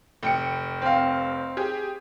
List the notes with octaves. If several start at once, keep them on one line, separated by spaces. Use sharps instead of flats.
F1 G5 C#7
C4 F5
G4 G#4